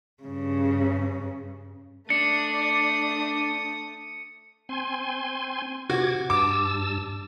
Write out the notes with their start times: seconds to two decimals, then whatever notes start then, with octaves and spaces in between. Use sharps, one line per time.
0.23 G2 C#3
2.10 A3 D4 D#6 C#7
4.69 C4 G#5 C6
5.90 C3 F#4 D6 G#6
6.30 G2 A5 D6 E6